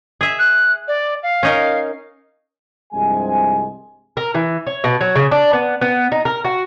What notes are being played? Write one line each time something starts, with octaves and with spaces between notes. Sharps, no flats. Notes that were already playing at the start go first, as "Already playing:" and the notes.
G#4 E5
F#6
D5
F5
C#4 D#4 A#4
C2 G2 C3 F3 G#3 G#5
A#4
E3
C#5
B2
F#3
C#3
D4
B3
B3
D#4
A#4
F#4